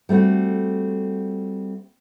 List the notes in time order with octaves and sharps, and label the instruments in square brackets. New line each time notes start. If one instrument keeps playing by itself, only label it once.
[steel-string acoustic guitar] G3 A3 C4 F#4